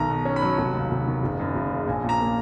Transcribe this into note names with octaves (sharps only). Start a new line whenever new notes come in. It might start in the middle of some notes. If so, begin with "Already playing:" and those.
Already playing: B1 D#3 A#5
B2
C#4
B5
F#3
F1
D#2
F1
D#3
F#1
F#2
F#1
C#3
A#1 G#5
A#2
A#5
A#3